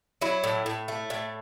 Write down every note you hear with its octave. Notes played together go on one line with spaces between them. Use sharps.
F#3 E4
A2
A2
A3
A2